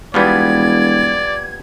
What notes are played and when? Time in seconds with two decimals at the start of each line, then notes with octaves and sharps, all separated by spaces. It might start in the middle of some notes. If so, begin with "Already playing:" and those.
0.14 E1 F3 G3 B3 D5 G#6